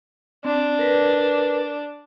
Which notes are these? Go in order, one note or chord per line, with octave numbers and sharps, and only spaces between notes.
C4 D4
A#4 B4